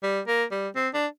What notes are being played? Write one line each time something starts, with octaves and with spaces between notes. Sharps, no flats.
G3
A#3
G3
C4
D4